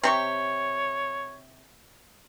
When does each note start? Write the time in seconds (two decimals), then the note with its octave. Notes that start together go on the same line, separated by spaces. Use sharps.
0.03 C3 G4 C#5 C#6